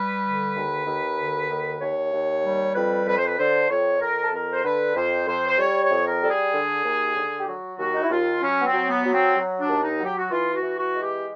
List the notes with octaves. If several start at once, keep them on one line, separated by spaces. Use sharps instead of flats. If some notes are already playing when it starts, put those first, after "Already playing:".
Already playing: G3 B4
D3
D#2
D#2
D3
D#2
D#2 C#5
D#2
G3
F2 B4
F2 B4
C5
B4
D3 C5
F2 C#5
F2 A#4
A4
F2 A#4
C5
D3 B4
F2 C5
F2 C5
C5
G3 C#5
C#5
F2
A#4
G3 A4
G#4
D3
D#2
D3
G4
F#3 F#4
D#2 F#4
D#4
E4
D#2 F4
F#3 C#4
B3
C4
F#3
B3
F#3
C4
F#3
D4
D#2
D#4
F#3 G4
F#4
E3 F4
F#4
E3
F#4
G#3
G4